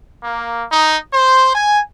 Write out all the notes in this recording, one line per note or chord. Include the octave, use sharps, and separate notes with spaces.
A#3
D#4
C5
G#5